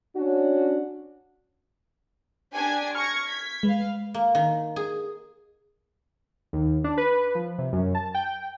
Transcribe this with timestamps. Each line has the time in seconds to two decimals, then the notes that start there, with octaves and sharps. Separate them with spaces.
0.16 C#4 D4 F#4
2.52 D4 G4 G#5
2.95 C#6 F6 G#6 A#6
3.26 G#6 B6
3.63 G#3 B4 F5
4.14 A#3
4.35 D#3
4.76 G#4
6.53 D#2
6.84 D4
6.98 B4
7.35 F3
7.58 C3
7.73 F#2
7.95 A5
8.14 G5